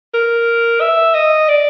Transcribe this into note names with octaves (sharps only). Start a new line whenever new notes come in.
A#4
E5
D#5
D5